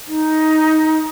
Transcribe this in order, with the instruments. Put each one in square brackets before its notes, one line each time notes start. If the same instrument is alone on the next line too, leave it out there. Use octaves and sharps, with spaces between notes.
[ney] D#4